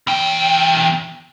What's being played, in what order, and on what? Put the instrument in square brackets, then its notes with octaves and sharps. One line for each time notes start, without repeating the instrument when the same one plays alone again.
[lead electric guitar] E2 G5